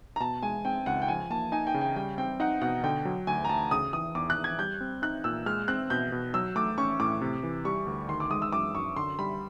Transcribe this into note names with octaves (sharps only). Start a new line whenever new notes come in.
A#5
B2 A5
G#3 G#5
C4 G5
C#2 F#5
G5
F3 G#5
A#3 A5
D#4 G#5
G5
C#3
G5
G3 G5
C4 G5
D#4 F#5
B2 F#5
D3 G5
F#3
D2 G#5
A#5
D2 A5
C#3 D#6
E3 D#6
E2 D6
F#6
E2
G#6
G3 G6
C4
D#4 F#6
A#2 E6
G#3 F6
C4 F#6
B2 G6
B2
F#3 E6
A3 D6
C#4 C#6
A2 D6
C3
E3
G3 C#6
D2
D#3 C6
D6
G#3 D#6
E6
F#2 D6
F#2 C#6
D3 C6
G3 B5